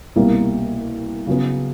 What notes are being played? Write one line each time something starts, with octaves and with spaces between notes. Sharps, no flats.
C2 B2 G3 A#3
C#3 F#3 B3